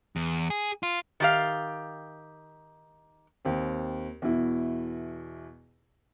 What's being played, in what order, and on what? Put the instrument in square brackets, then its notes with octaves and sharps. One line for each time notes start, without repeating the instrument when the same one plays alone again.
[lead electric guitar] E2
G#4
F4
[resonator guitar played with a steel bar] D#3 G4 F5
[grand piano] D#2 C4
E2 B2 E4